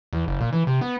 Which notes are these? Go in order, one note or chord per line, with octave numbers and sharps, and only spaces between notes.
E2
F#1
A#2
E3
C3
B3